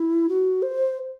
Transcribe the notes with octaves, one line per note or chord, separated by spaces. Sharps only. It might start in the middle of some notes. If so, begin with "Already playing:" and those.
Already playing: E4
F#4
C5